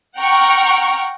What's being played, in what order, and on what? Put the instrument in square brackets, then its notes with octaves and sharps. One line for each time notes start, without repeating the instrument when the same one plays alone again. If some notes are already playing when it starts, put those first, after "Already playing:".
[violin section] F#5 G5 A#5 C#6 F6